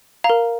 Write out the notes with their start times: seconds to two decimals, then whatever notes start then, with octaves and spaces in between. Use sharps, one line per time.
0.24 F5 A#5
0.30 A#4